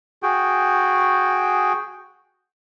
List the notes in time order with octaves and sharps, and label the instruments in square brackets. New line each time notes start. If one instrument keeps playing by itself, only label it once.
[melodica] F#4 G#4 G5